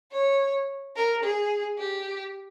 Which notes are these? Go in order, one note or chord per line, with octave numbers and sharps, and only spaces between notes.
C#5
A#4
G#4
G4